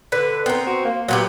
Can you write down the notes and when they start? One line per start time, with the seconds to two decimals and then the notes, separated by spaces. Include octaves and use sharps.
0.12 D3 B4
0.46 B3 C4 A#4
0.67 F#4
0.85 A#3
1.09 A#2 F#3 B3 G4